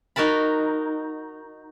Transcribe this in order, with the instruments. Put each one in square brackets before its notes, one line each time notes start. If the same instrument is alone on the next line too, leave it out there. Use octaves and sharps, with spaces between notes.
[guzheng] D#4 F#4 A#4 A5 B5